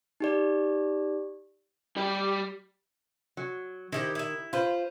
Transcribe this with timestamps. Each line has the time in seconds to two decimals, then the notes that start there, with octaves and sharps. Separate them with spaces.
0.20 D#4 G4 D5
1.97 G3 G4
3.37 F#3
3.92 D#3 E4 G4 C5
4.15 E4 E5
4.53 F4 B4 C5